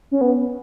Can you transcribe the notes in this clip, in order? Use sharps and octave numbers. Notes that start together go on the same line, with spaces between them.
C#4
B3